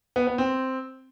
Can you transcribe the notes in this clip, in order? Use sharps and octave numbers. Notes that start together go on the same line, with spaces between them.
B3
B3
C4